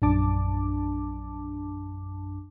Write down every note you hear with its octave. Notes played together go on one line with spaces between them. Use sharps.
A#1 F#2 D4 A5 D6